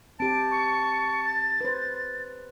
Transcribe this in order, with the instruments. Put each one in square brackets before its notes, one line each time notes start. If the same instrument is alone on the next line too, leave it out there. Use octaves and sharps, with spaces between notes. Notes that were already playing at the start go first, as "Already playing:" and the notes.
[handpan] C4 G4 [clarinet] A5 [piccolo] D7
[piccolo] C#6
A6
[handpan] B4 C5